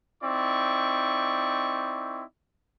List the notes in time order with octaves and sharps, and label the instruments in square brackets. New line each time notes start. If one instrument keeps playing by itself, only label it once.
[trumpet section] C4 D#4 E4 D5 C#6